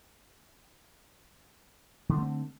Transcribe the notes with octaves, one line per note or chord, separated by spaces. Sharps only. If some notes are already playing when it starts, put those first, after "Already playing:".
D3 A3 C4 D4